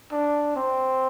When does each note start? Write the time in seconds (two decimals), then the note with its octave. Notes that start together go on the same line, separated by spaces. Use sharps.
0.12 D4
0.56 C4